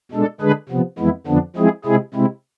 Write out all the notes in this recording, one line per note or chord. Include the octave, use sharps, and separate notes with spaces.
B2 G#3 D4 A4
D3 G#3 D4 G#4 B4
C3 F3 B3
F2 E3 G#3 B3 E4
F2 D3 F3 B3 D4
F3 G#3 C4 E4 G#4
C3 G#3 C4 E4 G#4
C3 G#3 C4 E4